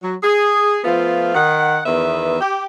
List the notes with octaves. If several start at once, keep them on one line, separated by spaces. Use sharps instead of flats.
F#3
G#4
F3 A3 B3 F4
D#3 F#5
E2 D#3 B3 B4 E5
G4